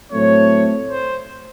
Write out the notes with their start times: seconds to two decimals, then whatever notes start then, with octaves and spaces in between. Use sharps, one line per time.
0.12 A2 F#3 A3 C4 C#5
0.90 C5